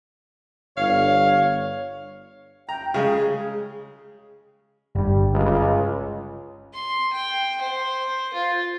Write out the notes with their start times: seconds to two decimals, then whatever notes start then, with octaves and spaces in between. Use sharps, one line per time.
0.77 G1 C#5 F5
2.69 G5 A#5
2.94 C#3 G#3 G#4
4.95 G1 G2 G3
5.34 C#2
6.73 C6
7.13 G5
7.62 C5
8.34 F4